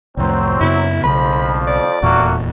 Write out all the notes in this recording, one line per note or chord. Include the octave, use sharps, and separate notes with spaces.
C2 F2 A2 F#3 C4
F#2 C#3 B3 E4
B1 F2 C#3 F3 B5
D5
D#1 E2 A#2 A3 A#3 F#4